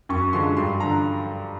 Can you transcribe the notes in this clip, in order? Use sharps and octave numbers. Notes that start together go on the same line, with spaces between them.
F#2 C#6
D3 F3 G#3 C6
G2 C6
D3 F3 A#5